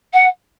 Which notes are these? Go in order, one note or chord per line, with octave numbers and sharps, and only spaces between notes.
F#5